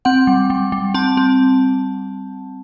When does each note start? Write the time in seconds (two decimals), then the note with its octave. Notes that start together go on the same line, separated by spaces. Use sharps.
0.05 C4 F#5
0.27 G3
0.50 G3
0.72 G3
0.94 C4 A5
1.17 C4